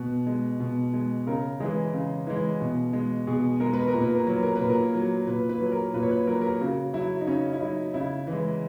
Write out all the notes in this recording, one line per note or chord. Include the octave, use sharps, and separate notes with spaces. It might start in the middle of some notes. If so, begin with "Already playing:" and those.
Already playing: B2
G#3
B2
G#3
C#3 A#4
E3 G#3 G#4
C#3
E3 G#3
B2
G#3
B2 G#4
G#3 A#4
B4
A#4
A#2
B4
A#4
F#3 B4
A#4
A#2 B4
A#4
F#3
A#2 B4
B4
F#3
A#4
A#2 B4
C#5
B4
F#3 A#4
B4
A#4
C#3 F#4
F#3 E4
D#4
C#3 C#4
E4
F#3 D#4
C#3 E4
E3 G#3